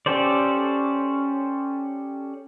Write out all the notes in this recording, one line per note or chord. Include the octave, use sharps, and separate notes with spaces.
C#4 G4 A4 C5 D5